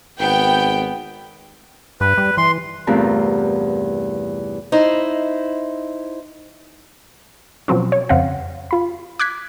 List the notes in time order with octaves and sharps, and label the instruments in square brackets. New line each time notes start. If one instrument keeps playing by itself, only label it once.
[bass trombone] G#1 [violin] B3 [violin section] G5
[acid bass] G2 [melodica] B4
[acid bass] G3
[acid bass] E3 [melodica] C6
[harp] E2 G2 C3 A3 F4 A#4
[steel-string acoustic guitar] D#4 E4 C5
[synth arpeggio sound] B2 F3 F#3 C4 C#4
C#5
F2 C#3 C4 F5 F#5
F4 B5
D6 F#6 G#6 B6